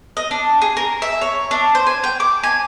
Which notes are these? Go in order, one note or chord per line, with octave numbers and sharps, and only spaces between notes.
D#5
D4
G#4
A#4
E5
C#5
D4
C5
G#5
G5
D6
G#5